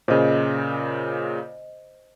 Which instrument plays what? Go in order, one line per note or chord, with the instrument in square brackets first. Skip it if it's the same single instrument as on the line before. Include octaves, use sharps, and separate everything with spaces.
[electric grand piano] A#2 C#3 [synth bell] C5 D#5